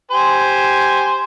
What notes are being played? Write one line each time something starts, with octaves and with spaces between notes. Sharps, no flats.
G4 C5 G#5